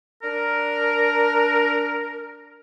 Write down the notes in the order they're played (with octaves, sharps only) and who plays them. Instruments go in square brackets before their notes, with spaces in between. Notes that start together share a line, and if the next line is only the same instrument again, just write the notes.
[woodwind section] D4 A#4